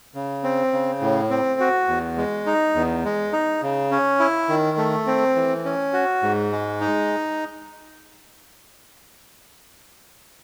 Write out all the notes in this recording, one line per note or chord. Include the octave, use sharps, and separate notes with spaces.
C#3
C4
C#3
A2
C4
F#4
E2
G#3
D#4
E2
G#3
D#4
C#3
C#4
E4
D#3
A3
C4
E3
C#4
F#4
G#2
G#3
D#4